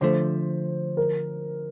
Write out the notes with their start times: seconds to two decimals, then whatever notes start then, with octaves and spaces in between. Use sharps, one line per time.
0.01 D3 F3 A3 C5
0.97 A#4